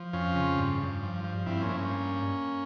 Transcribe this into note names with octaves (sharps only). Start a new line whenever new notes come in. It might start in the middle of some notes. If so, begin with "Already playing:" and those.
Already playing: F3
F2 C#4 F4
C#3
G2
G2
F3
F3
G2 C4 E4
A#3 C#4
G2 E4
A#3 C#4